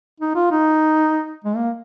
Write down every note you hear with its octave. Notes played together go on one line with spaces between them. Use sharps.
D#4
F4
D#4
G#3
A#3